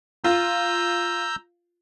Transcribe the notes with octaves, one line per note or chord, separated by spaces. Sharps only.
F4 A#5 E6 G6